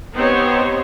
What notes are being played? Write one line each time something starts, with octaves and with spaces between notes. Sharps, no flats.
B3 C4 D#4 G4 C5 C#5